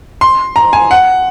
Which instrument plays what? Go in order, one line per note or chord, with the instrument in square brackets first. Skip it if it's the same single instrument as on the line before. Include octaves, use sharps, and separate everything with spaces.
[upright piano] C6
A#5
G#5
F#5